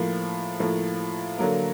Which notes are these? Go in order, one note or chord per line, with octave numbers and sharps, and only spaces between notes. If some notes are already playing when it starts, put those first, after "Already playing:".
Already playing: A2 F3 A#3
A2 F3 A#3
D3 F#3 A#3